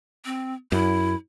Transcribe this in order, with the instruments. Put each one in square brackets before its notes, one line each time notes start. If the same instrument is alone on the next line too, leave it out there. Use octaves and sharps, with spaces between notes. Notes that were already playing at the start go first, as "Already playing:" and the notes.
[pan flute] C4
[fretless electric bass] F#2 [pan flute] E4